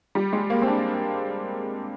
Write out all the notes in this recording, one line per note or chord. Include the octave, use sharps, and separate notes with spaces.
G3
G#3
A#3
C4
D4